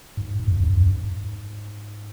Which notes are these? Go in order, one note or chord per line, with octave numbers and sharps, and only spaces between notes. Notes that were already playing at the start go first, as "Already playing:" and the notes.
G#2
G#2
F#2
E2
F#2
F#2
G#2